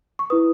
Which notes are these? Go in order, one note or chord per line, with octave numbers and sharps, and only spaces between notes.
C#6
E4 B4 D#6